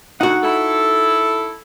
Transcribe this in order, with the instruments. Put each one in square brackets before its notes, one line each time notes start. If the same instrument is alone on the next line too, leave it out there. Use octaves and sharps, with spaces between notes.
[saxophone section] D2 F#5 [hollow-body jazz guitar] D#4 F#4
[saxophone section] E4 A4